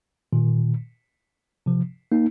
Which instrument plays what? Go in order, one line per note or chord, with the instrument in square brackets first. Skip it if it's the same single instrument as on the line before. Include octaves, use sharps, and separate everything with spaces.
[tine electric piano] A#2 D#3
C3 F3
A#3 D#4